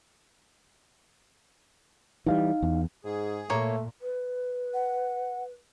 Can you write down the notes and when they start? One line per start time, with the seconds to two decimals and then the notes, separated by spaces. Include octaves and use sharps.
2.26 E3 F#3 G3 D#4 F5
2.63 E2
3.05 G#2 G#4
3.50 A#2 A3 A#3 C#5
3.99 B4
4.74 F#5